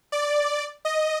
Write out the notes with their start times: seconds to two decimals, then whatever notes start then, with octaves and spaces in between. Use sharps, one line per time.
0.12 D5
0.85 D#5